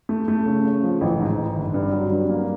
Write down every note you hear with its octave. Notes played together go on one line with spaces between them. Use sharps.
A3
A3
C#3
C#3
F3
A1
G#2
A1
G1
G2
F#3
G2
A#3